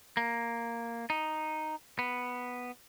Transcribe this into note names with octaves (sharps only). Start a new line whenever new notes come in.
A#3
D#4
B3